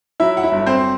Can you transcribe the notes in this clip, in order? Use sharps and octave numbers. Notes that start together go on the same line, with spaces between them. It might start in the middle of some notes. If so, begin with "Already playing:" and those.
F#3 E4 E5
F#5
E4 E5
G1
C4 C5